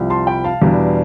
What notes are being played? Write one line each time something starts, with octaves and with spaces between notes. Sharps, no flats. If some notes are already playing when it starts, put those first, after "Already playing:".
Already playing: C2 C3 F3
A5 C6
G5 B5
F5 A5
E2 B2 G3 B3 D4